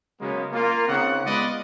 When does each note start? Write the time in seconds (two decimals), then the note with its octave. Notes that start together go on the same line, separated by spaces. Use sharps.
0.20 C#3 F#3 G#3 A#3 B3 C#4
0.53 A#3 F4
0.87 C#3 C4 D#4 F#5
1.25 G#3 B3 F4 B4 D5 D#5